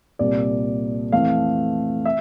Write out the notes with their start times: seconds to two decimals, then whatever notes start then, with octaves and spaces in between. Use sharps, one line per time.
0.19 C2 A#2 G3 D5
1.12 F2 E3 A3 F5
2.05 E5